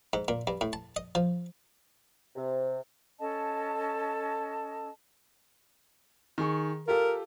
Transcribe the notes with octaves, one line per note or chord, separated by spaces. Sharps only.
G#2
A#2
G2
A2
A5
D#5
F3
C3
C#4 A4 D#5 A5
D#3 G#4 C#6
F4 G4 A4 A#4